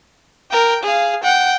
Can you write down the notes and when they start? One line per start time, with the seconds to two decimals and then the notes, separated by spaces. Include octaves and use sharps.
0.51 A#4 G5
0.83 G#4 F5
1.23 F#5 G5